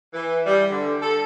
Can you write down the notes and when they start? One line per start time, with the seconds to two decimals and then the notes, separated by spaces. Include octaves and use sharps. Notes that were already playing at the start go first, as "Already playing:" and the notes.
0.14 E3
0.45 G3
0.69 D3
1.01 A4